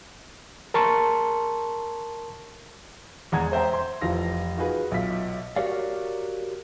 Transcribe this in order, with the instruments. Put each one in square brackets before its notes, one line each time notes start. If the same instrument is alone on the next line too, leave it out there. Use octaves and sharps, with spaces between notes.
[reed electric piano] A#4 A5 C6 C#6
[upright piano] E2 G#3 F#5 A#5 G#6
C4 C5 E5 G5 A#5
C6
F1 E3 F3 F5 A#6
D#4 F4 F#4 G#4 B4
B1 F4 E5 B6
[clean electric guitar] F#4 G4 A#4 C#5 D5 F5